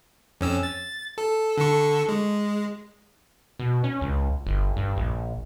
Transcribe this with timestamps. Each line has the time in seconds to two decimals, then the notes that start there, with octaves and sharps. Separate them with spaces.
0.41 F2 C#4 E6
0.63 A6
1.18 A4
1.57 D3 A4 C#6
2.08 G#3
3.59 B2
3.84 C#4
4.01 C#2
4.47 G1
4.77 G2
4.97 A#1